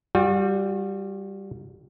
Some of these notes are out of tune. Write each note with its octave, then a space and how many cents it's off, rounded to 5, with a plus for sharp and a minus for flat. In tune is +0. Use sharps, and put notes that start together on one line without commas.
G3 +0 F#4 -40